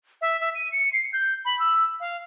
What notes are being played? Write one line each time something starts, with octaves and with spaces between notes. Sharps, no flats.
E5
E5
D#7
C#7
C7
G6
B5
E6
F5